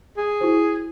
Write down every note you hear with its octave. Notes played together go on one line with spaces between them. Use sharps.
G#4
E4 F#4 C5